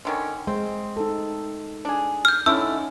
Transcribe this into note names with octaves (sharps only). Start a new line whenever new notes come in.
D3 D#3 C#4
G#3 C4
D#4 A4
D4 G#4
F6 G6
D3 A3 C#4 D#4 E4 E6